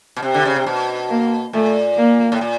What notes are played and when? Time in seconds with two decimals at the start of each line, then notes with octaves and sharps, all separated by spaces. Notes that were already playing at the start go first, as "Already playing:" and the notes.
0.16 B2
0.23 C3
0.34 D3
0.45 C#3
0.56 C3
0.66 B2
1.10 A#3
1.53 A#2 A3
1.97 A#3
2.32 A2
2.41 A#2